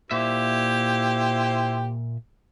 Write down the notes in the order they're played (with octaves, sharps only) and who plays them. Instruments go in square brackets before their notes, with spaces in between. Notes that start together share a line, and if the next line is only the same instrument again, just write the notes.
[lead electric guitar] A#2 E5 [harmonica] E4 G4 C5